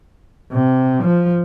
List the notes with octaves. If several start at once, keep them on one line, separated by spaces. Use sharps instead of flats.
C3
F3